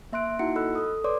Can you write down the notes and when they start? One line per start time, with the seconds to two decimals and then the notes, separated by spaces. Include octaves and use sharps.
0.12 A#3 E5 C6 F#6 D7
0.39 A#3 D#4 E4 F#4 F#5 C#7
0.56 A4 D#5 B5 E6 F#6
0.75 A4 D#6
1.04 B4 C#5 D5 C6 D6